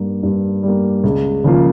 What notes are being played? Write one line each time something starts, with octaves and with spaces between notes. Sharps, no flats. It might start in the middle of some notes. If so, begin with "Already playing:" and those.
Already playing: G2 G3 A#3
G2
G3 A#3
C#2
C#3 F3 A#3 F4